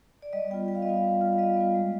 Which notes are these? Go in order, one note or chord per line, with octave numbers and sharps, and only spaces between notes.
D5
G3 D#5
B3 F4 G5
G3 G5
F5
D#5
B3 F4 F5
G3
B3 F4
F5
G3 D#5
B3 F4
G#3